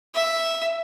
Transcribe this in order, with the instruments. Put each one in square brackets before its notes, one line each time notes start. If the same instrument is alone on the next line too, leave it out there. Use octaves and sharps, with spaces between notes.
[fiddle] E5